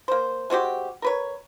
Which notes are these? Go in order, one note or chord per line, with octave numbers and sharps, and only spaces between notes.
A#3 C5
G#3 C4 F#4 G4
A#4 B4 C#5